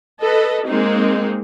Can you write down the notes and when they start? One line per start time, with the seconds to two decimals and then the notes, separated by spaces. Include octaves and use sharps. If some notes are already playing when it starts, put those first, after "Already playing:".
0.21 A4 B4 D#5
0.66 G#3 A#3 C4 D#4